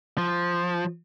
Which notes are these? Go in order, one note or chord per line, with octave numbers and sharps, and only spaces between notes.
F3